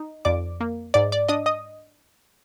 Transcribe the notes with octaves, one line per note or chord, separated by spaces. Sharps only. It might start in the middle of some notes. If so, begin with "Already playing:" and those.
Already playing: D#4
F2 D5 D6
A#3
G#2 D5 D6
D5 D6
D4 D#5 D#6
D#5 D#6